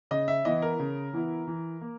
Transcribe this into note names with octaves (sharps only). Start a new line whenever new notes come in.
C#3 D#5
E5
E3 B3 E4 D#5
A#4
C#3
E3 B3 E4
E3
A#3